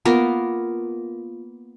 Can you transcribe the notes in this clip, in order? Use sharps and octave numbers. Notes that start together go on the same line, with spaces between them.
A#3 B3 F4 A#4